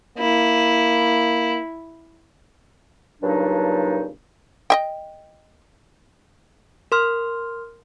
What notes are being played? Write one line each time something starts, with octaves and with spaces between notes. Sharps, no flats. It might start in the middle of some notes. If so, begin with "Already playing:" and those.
A#3 E4
G2 A#2 C#3 F#3 D4 D#4
D#5 E5 G5
A#4 C6 F6